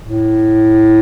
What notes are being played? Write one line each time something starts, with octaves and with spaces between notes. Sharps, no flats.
A2